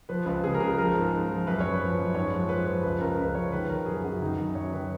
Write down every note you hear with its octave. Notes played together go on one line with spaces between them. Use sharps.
F3 B4
C#2 B4
C#3 G#4
A#4
C#2 G#4
F3 A#4
G#2
G#2
F3
F#2 B4
F#2 C#5
B4
F3
F#2
G#2 C#5
F3
F3 B4
F3
C#2 B4
C#2 A#4
C#2 B4
F3 C#5
D#3 B4
D#3 A#4
F#2 G#4
F#2 F#4
D#3 D#4
F#2 D#4
F#2 C#5
D#3 B4